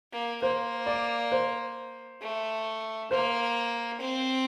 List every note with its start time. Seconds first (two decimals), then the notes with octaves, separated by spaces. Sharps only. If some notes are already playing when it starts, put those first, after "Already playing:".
0.12 A#3
0.42 A#3 C5
0.86 D5
1.32 C5
2.21 A3
3.11 A#3 C5
4.01 C4